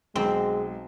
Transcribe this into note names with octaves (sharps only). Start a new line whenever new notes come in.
B1 G#3 C4